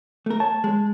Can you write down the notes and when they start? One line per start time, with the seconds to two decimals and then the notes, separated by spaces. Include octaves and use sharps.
0.26 A3 A#4
0.40 C#5 A5
0.64 G#3